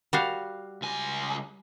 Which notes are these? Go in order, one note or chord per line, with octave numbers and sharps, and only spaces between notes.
G3 F#4 F5
C#2 G#5